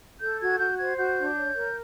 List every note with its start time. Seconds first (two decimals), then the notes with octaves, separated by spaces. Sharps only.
0.21 A4 G6
0.40 F#4 G#6
0.59 F#4 G6
0.79 C5 G#6
0.97 F#4 G6
1.17 D4
1.36 C#5
1.55 A#4